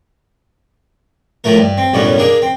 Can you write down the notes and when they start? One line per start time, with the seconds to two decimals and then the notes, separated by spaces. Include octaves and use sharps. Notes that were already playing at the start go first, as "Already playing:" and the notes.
1.44 A2 F3 A3 A#4
1.57 G2
1.78 C4
1.94 B1 F#2 A2 G3 C#4
2.18 A#3 D4 G#4
2.42 C4